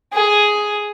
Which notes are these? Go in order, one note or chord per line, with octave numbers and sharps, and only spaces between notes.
G#4